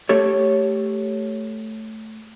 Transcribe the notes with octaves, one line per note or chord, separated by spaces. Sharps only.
A3 G4 A4 C#5